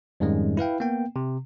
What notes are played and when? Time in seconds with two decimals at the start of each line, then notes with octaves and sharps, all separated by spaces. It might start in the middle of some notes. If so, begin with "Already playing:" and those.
0.20 F2 G#2 D#3 G3 G#3 C#4
0.57 E4 B4 F5 G5
0.80 A#3 B3 G5
1.16 C3